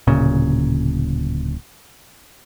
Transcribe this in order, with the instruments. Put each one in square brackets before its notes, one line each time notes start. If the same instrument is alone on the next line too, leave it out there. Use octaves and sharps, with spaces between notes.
[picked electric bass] D1 A#2 C#3